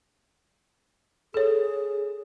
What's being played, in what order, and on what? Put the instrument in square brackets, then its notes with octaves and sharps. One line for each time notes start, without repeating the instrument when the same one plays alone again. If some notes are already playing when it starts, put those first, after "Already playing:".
[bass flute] G#4 [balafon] A4 C#5